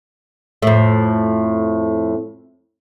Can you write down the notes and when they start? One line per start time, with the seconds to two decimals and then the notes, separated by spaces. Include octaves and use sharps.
0.62 F2 A2